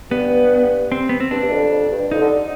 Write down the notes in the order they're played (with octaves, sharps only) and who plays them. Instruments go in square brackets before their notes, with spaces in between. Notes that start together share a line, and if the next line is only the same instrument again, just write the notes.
[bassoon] G2 [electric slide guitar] B3
[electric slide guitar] C4
B3
C4
[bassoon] G2 [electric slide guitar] D4
[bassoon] G2
F2
F2
G2
[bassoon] F2 [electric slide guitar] D#4
[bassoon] D3